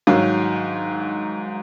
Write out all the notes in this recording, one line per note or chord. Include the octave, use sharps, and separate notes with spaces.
G#2 D#3 F#3 F5